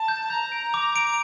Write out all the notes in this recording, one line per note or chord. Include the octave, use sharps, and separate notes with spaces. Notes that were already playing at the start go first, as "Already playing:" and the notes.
Already playing: A5
G6
A#5 G6
D7
D6
D7